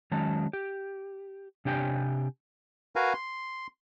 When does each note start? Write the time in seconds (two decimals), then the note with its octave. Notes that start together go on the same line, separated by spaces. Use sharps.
0.11 D#3 F#3 G#3 C#4 A5
0.53 G4
1.65 C3 D4 G4 G5 G#5
2.96 F#4 A#4 B4 F5 G#5 A#5
3.14 C6